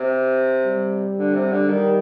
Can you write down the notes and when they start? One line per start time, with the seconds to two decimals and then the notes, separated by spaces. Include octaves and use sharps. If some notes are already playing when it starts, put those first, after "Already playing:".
Already playing: C3
0.66 G3
1.17 D3
1.34 C3
1.52 D3
1.69 D#3 G3